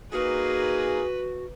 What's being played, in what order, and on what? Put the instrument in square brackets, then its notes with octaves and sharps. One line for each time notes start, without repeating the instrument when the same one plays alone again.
[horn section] A#3 D#4 G#4 [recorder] F#4 [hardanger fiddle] B4